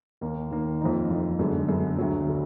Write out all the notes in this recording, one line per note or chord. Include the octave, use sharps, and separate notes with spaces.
D#2 D#3 A#3
D#2 D#3 A#3
F2 F3 A#3 D#4
F2 F3 A#3 D#4
F#2 D3 G#3 B3
F#2 D3 G#3 B3
D2 D3 F#3
D3